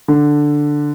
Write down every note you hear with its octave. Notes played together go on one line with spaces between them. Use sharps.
D3